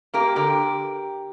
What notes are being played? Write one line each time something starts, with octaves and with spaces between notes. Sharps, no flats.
A#3 G4 A#4
D3 G4 A#4